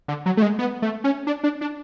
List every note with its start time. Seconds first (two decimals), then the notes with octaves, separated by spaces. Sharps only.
0.08 D3
0.26 F#3
0.37 A3
0.42 G#3
0.59 B3
0.82 A3
1.04 C#4
1.27 D4
1.44 D4
1.61 D4